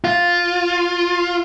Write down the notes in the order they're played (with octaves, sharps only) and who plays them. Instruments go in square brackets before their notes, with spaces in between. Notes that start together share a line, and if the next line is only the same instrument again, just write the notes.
[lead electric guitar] F4